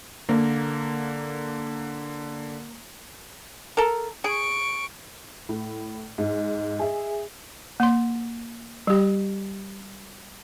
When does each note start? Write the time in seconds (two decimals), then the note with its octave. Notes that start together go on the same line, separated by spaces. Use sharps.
0.29 D3 A#3
3.77 A4 A#4
4.24 G#4 C#6 D7
5.49 A2
6.18 G#2
6.79 G#4 E5
7.80 A#3 C6
8.87 G3 G4